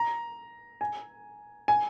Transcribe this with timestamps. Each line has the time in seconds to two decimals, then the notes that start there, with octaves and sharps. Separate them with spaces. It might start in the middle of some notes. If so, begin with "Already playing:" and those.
Already playing: A#5
0.81 G#5
1.68 G#5